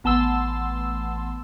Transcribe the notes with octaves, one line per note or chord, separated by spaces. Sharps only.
A1 B3 A5 C6 E6